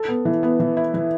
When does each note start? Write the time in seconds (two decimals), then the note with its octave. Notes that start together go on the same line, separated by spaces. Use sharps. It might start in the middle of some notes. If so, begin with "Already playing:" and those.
Already playing: A4
0.09 B3
0.25 E3
0.43 B3
0.60 E3
0.77 E4
0.94 E3